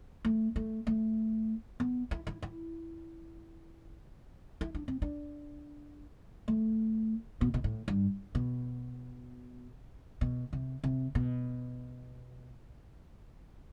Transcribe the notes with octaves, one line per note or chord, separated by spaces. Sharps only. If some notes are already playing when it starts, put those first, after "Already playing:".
A3
A3
A3
B3
E4
E4
E4
E4
D4
C4
D4
A3
B2
B2
A2
G2
B2
B2
C3
C3
B2